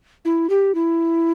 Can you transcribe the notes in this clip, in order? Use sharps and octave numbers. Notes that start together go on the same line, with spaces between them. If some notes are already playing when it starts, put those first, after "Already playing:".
E4
G4
E4